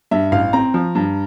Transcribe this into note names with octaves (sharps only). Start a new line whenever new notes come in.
G2 E5
A1 F5
C4 A#5
F3
G2